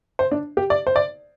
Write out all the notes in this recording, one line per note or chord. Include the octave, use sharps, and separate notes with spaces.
C5
D4
G4
D5
C5
D5